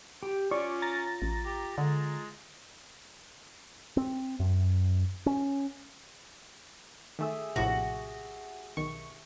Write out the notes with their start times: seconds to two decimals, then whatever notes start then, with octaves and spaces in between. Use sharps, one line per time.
0.23 G4
0.51 C#4 F4 D5 C#6 D6
0.82 A#5 A6 A#6
1.22 A1
1.46 G4
1.78 D3 G#3
3.97 C4
4.40 F#2
5.26 C#4
7.19 D#3 A3 G4 G#4 E5
7.56 A#1 A2 C3 F#4
8.77 B1 D#3 C#6